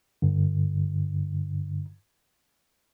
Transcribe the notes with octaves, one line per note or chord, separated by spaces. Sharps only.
G2 D3